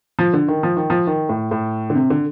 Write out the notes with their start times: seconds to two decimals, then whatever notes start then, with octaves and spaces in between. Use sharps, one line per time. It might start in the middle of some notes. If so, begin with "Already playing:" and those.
0.19 F3
0.33 D3
0.48 D#3
0.63 F3
0.77 D#3
0.90 F3
1.07 D#3
1.29 A2
1.51 A2
1.90 D3
1.95 C3
2.10 D3